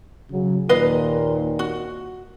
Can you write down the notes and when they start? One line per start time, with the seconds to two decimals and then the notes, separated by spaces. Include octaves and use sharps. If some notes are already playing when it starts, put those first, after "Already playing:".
0.31 C#3 F#3
0.69 D#2 A#2 B4 D#5 F5
1.59 F#4